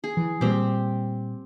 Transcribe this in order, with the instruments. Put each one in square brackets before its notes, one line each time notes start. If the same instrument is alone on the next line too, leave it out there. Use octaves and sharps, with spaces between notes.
[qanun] G#4
[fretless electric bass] E3
[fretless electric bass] A#2 G3 [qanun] C4 G4